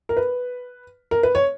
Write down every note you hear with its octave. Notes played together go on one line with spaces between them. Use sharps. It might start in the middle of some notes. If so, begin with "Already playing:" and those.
A#4
B4
A#4
B4
C#5